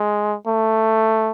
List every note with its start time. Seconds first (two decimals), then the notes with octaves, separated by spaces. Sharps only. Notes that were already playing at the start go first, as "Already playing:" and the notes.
Already playing: G#3
0.47 A3